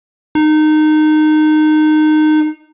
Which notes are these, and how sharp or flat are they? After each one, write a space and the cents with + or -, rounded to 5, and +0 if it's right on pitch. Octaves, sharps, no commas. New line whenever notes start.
D#4 -20